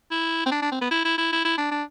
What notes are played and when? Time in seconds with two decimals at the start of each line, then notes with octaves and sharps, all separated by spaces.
0.11 E4
0.46 C4
0.52 D4
0.62 D4
0.72 C4
0.81 B3
0.91 E4
1.05 E4
1.18 E4
1.32 E4
1.45 E4
1.58 D4
1.71 D4